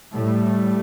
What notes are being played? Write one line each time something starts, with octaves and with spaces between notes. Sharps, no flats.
A2 G3 A3